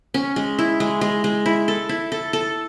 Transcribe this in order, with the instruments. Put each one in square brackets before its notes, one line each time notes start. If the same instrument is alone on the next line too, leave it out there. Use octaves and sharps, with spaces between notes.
[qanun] C#4
G#3
E4
G#3
G#3
G#3
E4
A4
E4
A4
A4